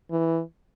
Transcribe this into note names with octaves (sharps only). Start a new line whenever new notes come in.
E3